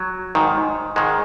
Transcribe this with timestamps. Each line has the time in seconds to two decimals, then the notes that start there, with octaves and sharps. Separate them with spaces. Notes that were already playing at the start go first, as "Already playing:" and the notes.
Already playing: F#3
0.35 G#2 D#3
0.96 G#2 D#3 G#3